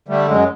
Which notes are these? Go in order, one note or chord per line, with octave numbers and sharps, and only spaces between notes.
D3 G3 A3
F#2 F#3 G#3